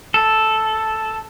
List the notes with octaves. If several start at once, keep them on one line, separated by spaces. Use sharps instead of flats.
A4